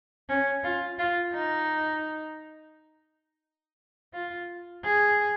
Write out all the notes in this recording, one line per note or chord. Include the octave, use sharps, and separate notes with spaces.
C#4
F4
F4
D#4
F4
G#4